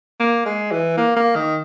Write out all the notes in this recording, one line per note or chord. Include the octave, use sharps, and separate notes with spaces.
A#3
G#3
E3
A#3
A#3
D#3